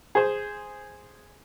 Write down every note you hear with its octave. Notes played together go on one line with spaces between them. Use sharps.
G#4 C5